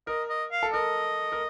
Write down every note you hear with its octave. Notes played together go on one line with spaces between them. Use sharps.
A#4 D#5
D#5
F5
A4
A#4 D#5
A#4